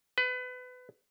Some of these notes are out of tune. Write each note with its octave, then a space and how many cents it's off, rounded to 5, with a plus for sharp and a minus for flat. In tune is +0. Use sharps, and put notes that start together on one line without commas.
B4 +25